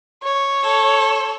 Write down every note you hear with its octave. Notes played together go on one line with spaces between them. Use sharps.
C#5
A4